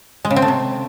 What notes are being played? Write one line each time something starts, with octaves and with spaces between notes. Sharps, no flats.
G#3
C#3
C4
A3
C3